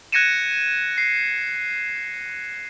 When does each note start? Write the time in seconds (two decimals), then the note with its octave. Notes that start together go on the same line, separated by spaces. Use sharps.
0.12 F#6 G#6 A#6 C#7 D#7 E7
0.98 C7